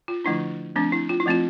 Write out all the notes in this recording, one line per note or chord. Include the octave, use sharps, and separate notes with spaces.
F4
D3 F3 A3 D4 E4
F3 A3 C4 D4
E4
F4
E4
F3 A3 C4 F4